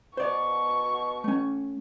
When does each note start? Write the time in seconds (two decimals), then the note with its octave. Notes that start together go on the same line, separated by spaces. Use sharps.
0.17 B2 C5 D5 C#6
1.24 A3 C#4